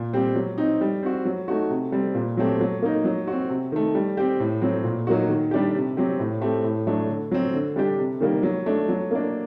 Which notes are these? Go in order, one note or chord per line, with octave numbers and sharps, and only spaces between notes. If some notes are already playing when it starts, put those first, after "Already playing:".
Already playing: A#2
G3 C4 G4
F#3
C4 D#4
G3
C4 F#4
F#3
A3 D#4 F#4
C3
G3 C4
A#2
F#3 A3 C4 G4
F#3
A#3 D#4
F#3
C4 F#4
C3
D#3 A3
G3
C4 G4
A2
F#3 C4
A#2
F#3 A#3 D#4 F#4
D#3
G3 D4 G4
C3
F#3 C4 G4
A2
A3 C4 G4
A2
F#3 A3 D4
D3
F#3 C4
D3
G3 D4 G4
C3
D#3 G3 A#3
F#3
A3 D4
F#3
A#3 D4